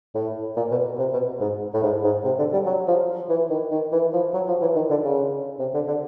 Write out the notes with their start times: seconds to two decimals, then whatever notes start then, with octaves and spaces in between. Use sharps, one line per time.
0.15 A2
0.56 A#2
0.71 B2
0.99 C3
1.13 B2
1.41 G#2
1.74 A2
1.83 G#2
2.04 G#2
2.24 C3
2.39 D3
2.53 G3
2.66 F#3
2.88 F3
3.29 E3
3.50 D#3
3.71 D#3
3.92 E3
4.13 F3
4.34 F#3
4.48 F3
4.61 E3
4.76 D#3
4.90 D3
5.04 C#3
5.59 C3
5.74 D3
5.88 D3